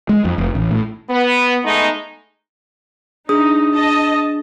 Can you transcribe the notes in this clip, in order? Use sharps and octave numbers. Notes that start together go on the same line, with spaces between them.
G#3
F2
F1
A1
A2
B3
G#3 A3 B3 D#4
D4 D#4 G#4 D#6
D#5 A5